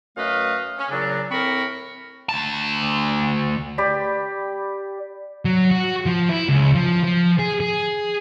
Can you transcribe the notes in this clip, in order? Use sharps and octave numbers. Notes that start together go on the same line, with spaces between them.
F#2 A3 B4 D#5 F5
C#4
A#2 C#3 F#3 D4
A2 C4 A#4 B5 C#6
D2 A5
G4 D5 B5
F#3
F#4
F3
E4
C#2
F3
F3
G#4
G#4